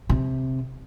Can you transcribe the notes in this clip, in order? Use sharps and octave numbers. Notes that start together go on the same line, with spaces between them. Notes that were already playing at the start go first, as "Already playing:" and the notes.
C3